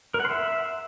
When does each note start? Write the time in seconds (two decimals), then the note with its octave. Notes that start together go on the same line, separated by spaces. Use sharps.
0.14 A#4
0.20 F#5
0.25 C6
0.30 E5